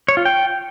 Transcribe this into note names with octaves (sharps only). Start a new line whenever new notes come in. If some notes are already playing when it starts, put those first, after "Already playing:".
C#5
F4
G5